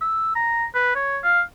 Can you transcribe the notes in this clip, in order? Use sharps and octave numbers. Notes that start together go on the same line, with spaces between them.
E6
A#5
B4
C#5
F5